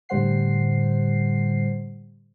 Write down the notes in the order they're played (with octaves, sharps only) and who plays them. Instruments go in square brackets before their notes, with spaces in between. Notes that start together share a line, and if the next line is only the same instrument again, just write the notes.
[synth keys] A2 D3 G3 C5 F#5 C7